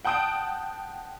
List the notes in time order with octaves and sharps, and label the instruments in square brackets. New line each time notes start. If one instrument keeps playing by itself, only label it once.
[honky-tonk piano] F#5 G5 A5 D#6 G6 D7